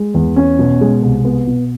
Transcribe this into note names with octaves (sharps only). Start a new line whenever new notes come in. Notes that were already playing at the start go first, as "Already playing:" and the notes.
Already playing: G#3
E2
C#4
B2
G#3
C2
B3
B2